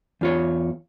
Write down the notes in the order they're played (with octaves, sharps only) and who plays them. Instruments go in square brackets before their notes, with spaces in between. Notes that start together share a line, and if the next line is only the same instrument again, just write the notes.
[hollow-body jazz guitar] E2 F4 C#5